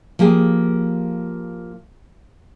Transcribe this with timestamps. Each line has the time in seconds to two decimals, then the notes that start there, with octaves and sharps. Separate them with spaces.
0.19 F3 A#3 G4 G#4